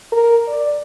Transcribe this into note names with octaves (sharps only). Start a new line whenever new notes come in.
A#4
D5